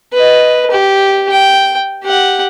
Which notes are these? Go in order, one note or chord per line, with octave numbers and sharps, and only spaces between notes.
B4 D#5
G4
G5
G4 F#5